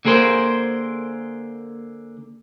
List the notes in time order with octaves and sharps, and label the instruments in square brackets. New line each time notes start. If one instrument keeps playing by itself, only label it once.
[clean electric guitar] D3 A#3 G#4 A#4 C5